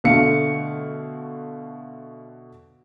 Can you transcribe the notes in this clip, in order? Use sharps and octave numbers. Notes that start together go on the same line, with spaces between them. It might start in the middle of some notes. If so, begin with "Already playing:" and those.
B2 D3 A3 F5 C#7